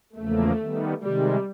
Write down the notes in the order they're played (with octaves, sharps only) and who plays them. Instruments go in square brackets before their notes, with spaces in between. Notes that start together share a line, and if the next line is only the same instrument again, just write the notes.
[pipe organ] E2 C#3 F3 A#3 [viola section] A3
[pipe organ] D#3 G3 B3
[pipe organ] C3 D#3 G#3 [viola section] G3